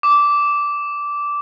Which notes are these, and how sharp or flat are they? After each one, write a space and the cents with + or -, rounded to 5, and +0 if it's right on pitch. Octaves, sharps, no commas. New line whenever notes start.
D6 -10